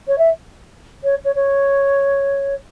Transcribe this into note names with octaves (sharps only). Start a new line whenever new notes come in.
C#5
E5
C#5
C#5
C#5